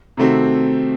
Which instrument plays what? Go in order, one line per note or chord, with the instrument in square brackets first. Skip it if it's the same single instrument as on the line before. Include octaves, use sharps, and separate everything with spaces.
[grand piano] C3 D#3 A3 C4 F#4